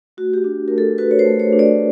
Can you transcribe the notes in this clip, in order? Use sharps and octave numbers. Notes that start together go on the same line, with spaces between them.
A3 F#4
G4
F#4
D4
A3 A#4
A4
F#4 B4
C#5
C5
A3
C#5
D4
D5